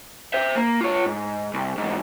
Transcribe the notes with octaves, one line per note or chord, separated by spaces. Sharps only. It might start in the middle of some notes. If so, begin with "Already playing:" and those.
C5 E5
A#3
F4 C#5
G#2
C2
G#2 E3